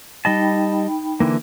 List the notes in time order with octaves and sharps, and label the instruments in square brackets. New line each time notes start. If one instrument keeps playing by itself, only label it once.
[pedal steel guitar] G3 D#5 A5 [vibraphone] D#4 G5 B5
[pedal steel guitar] D3 E3 A#3